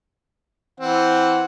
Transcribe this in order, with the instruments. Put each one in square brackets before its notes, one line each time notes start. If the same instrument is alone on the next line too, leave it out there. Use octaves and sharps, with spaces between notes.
[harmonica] E3 C4 F#5